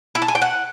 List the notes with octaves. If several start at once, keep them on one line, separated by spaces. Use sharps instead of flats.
E4
A5
G#5
G5
F#5